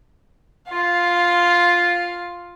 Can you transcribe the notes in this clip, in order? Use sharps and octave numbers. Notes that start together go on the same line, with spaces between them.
F4 F5